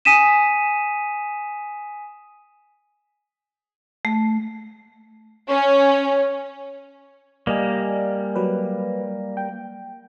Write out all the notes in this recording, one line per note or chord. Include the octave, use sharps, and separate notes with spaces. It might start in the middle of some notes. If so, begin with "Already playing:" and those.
G#5 D#6 B6 D#7 E7
A3
C#4
G3 A#3 D5 D#5 G#5
F#3 B4
G5